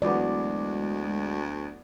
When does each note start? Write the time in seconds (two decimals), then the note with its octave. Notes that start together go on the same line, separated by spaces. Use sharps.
0.02 D2 E3 F#3 G#3 B3 D5